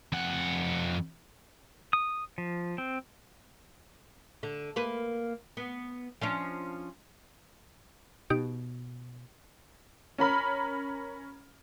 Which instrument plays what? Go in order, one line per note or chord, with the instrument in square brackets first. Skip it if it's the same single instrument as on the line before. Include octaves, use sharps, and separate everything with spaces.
[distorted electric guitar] F2 F#5
[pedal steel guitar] D#6
F3
C4
[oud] D3
A#3 B4
B3
F3 C#4 D4
[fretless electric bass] B2 [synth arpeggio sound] D#4 G4 D7
[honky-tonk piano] C#4 A#4 B5 F6